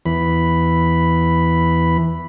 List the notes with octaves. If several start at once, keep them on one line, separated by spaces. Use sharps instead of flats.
E2 E3 B5